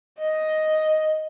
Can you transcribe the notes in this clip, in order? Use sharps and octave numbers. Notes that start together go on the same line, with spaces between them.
D#5